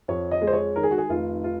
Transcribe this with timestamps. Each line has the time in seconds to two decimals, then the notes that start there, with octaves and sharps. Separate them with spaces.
0.08 F2 C#5
0.31 D#5
0.42 G#3
0.47 C5
0.53 C#5
0.76 D#3 A#4
0.83 G#4
0.91 F#4
0.98 G#4
1.09 F1 F4
1.44 F4